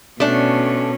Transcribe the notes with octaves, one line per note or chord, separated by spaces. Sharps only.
B2 A3 C#4 D4